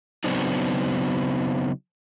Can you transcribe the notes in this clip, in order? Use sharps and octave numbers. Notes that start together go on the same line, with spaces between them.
C#3 F#3 B3 C4 D4 D#4